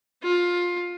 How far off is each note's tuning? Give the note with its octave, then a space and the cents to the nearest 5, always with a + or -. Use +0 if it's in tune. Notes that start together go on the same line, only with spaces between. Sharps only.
F4 +15